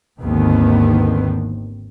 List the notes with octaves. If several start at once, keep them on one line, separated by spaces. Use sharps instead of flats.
G#1 D#2 D3 D#3 B3 C4